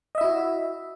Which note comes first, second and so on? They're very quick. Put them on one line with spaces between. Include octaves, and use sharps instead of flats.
D#5 E5 E4 F#4